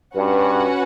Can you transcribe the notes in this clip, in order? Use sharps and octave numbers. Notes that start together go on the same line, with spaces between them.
G2 C#4 F#4 B4 F#5